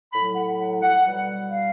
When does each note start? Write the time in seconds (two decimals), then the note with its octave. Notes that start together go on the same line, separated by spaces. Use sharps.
0.13 A2 F#3 B5
0.36 F#5
0.59 F#5
0.82 F#5
1.05 B2 G3
1.50 F5